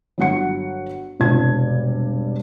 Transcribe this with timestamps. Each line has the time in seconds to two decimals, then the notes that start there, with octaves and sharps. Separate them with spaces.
0.18 G1 F#3 F#4 F#5 C#7
1.20 E1 G2 C3 G3 D4 G#6